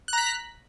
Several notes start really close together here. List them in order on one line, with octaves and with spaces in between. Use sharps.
F#6 A#5 B6